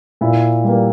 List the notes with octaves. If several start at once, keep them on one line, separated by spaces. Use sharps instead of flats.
A#2 E4
G3 A#3